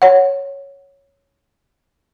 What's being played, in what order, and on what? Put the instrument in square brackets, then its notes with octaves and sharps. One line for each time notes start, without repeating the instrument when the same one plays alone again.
[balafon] C#5 F#5